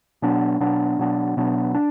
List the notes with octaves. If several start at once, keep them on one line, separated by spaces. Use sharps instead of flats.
B2 F#3 B3 D4
B2 F#3 B3 D4
B2 F#3 B3 D4
B2 F#3 B3 D4
D4